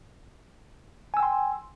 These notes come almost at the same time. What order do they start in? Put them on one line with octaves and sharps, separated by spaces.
G#5 E6 G5 C6